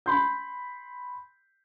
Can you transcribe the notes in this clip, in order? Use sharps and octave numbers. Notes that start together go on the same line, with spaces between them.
B5 C6 G6